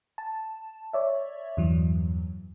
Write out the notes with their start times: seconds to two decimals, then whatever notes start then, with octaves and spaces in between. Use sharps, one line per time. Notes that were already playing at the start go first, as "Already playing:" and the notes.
0.18 A5
0.93 C#5 D5 E5
1.57 E2 G2 E3 F#3